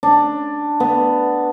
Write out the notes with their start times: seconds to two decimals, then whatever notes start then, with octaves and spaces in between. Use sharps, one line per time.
0.03 D4
0.80 B3